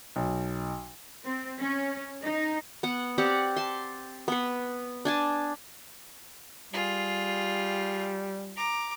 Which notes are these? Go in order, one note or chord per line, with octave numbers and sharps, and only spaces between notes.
B1
C4
C#4
D#4
B3 F#5
C4 G4 D5 F#5
A5 C6
B3 B4
D4 G#5 A5
G3 F4 G#4
A#5 D6